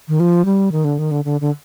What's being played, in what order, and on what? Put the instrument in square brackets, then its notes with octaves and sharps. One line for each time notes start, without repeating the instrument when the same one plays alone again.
[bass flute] D#3
F3
G3
D#3
D3
D#3
D3
D3
D3